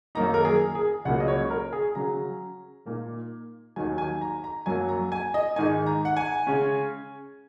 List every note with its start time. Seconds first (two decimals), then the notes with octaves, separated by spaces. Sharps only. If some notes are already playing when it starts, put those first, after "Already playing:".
0.15 F#2 D#3 A#3 D#4 A#5
0.34 A#4
0.45 G#4
0.75 G#4
1.05 C#2 C#3 F#3 A#3 F#5
1.20 D#5
1.28 C#5
1.50 A#4
1.73 G#4
1.95 C#3 F#3 C#4 A#5
2.86 A#2 A#3 D#4
3.76 D#2 D#3 F#3 G#5
3.98 G#5
4.21 A#5
4.44 A#5
4.66 F#2 F#3 A#3 G#5
4.89 A#5
5.12 G#5
5.34 D#5
5.56 G#2 D#3 G#3 D#4 G#5
5.86 A#5
6.05 F#5
6.17 G#5
6.47 C#3 G#3 C#4